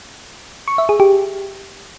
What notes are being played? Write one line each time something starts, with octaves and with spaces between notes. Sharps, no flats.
C#6
E5
G#4
G4